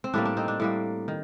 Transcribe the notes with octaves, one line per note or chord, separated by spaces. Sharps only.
C4
A2 G3 A#3 D4
D4
C4 D#4
D4
A2 G3 A#3
D#3